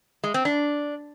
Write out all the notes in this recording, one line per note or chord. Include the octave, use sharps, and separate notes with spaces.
G#3
C4
D4